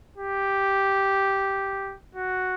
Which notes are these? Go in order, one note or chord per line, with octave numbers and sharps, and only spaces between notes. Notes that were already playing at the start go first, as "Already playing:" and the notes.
G4
F#4